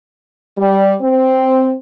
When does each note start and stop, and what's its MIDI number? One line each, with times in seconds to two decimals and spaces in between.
0.57 0.93 55
1.01 1.74 60